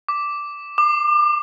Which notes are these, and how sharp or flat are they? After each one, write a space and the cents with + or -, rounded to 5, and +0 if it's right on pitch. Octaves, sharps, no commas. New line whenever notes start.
D6 -5
D6 +35